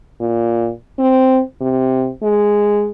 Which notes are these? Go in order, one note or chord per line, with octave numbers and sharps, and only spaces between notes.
A#2
C4
C3
G#3